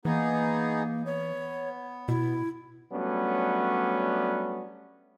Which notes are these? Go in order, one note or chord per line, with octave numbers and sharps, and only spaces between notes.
E3 A#3 B3 D#4 G#4
B3 C#5
B2 E4
F#3 G3 A3 B3 C#4 D4